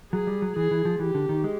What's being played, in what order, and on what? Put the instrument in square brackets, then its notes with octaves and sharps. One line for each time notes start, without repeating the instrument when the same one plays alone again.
[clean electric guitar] F#3 [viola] G#4
[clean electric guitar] G3
F#3
[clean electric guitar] E3 [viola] G#4
[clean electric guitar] E3
F3
[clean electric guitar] E3 [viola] G4
[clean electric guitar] D3
D#3
G#3